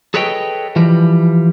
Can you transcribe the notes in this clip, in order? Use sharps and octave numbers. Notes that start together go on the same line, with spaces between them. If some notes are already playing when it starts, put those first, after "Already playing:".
G#4 A4 B4 C#5 D#5 G5
E3 F3 G3